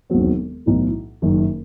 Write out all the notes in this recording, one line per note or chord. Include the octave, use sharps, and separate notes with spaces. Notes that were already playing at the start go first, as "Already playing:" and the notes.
E1 D#2 D#3 F#3 C4
B1 A2 E3
F#1 F#2 D#3